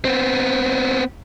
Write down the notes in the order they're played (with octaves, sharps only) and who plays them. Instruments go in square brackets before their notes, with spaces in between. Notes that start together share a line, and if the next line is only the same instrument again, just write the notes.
[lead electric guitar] B3 C4